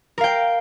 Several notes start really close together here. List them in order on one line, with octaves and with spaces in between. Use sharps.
A#4 F5 G5